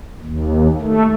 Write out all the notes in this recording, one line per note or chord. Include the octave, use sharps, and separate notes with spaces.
D#2
A3